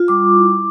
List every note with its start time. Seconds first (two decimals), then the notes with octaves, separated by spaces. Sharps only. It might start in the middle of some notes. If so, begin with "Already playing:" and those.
Already playing: F4
0.08 G3 D6
0.35 E4